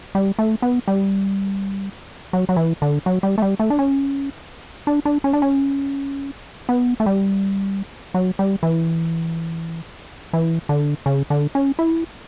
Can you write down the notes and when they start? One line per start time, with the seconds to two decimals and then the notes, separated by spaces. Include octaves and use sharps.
0.15 G3
0.39 A3
0.62 B3
0.88 G3
2.33 F#3
2.49 F#3
2.56 E3
2.82 D3
3.06 F#3
3.23 G3
3.38 A3
3.42 G3
3.59 A3
3.70 D4
3.79 C#4
4.87 D4
5.05 D4
5.24 C#4
5.33 D4
5.42 C#4
6.69 B3
7.00 A3
7.06 G3
8.14 F#3
8.39 G3
8.63 E3
10.33 E3
10.69 D3
11.06 C#3
11.30 D3
11.55 C#4
11.79 E4